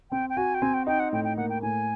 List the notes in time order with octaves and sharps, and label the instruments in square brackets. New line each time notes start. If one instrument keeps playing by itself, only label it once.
[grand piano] C4 [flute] G5
[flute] G5
[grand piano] F#4 [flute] G#5
[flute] G5
[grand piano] C4 [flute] G#5
[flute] G5
[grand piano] D#4 [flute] G5
[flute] F#5
[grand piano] A2 [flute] G5
[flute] G5
[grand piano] A#3 [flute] F#5
[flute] G5
[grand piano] A2 [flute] G#5